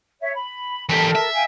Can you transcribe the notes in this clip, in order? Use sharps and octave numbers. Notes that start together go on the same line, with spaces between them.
C#5 E5
B5
E3 G4 A4 A#4 A5
E5
F5 G5 G#5